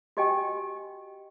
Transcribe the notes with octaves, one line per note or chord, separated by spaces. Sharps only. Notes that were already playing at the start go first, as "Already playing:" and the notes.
F#4 G4 D#5 G5 G#5